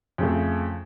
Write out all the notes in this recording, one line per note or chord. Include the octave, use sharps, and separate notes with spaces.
F2 C#3 A3